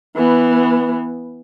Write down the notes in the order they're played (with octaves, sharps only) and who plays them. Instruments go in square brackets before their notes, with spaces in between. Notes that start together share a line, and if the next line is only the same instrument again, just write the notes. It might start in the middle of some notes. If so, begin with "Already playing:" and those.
[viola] E3 B3